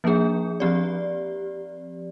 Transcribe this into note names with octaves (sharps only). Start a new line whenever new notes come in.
F3 A#3 D4 G#4
F3 C4 G4 D5